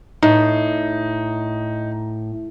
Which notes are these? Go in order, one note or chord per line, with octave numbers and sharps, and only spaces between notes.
A2 D#4